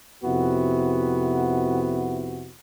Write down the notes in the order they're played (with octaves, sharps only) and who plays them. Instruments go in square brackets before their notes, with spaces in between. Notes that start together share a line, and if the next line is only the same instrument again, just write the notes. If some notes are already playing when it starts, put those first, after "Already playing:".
[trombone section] F2 C3 B3 E4 F#4